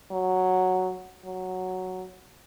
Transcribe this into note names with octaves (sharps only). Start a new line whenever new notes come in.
F#3
F#3